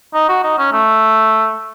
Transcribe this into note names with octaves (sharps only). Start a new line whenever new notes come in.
D#4
F#4
D#4
C#4
A3